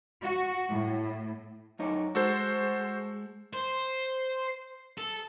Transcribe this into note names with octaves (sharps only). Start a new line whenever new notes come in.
F#4
A2
F#2 D#4 C#5
G#3 F#4 A4 C5
C5
A4